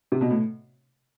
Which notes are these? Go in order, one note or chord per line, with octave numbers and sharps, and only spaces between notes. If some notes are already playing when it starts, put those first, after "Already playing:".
C3
B2
A2